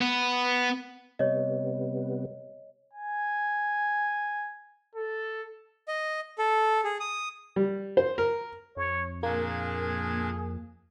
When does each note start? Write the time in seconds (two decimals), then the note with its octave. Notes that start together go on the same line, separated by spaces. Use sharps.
0.02 B3
1.19 C3 G3 B3 C#5 D#5
2.93 G#5
4.95 A4
5.88 D#5
6.38 A4
6.84 G#4
7.00 D#6
7.56 G3
7.97 C5
8.18 A#4
8.77 F2 C#5
9.23 A#2 A#3 D4 G#4 G#6